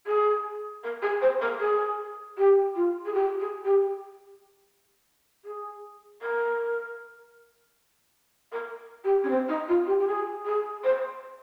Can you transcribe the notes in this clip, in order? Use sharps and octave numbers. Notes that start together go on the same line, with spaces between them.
G#4
A#4
G#4
C5
A#4
G#4
G4
F4
G#4
G4
G#4
G4
G#4
A#4
A#4
G4
C#4
C4
D#4
F4
G4
G4
G#4
G#4
C5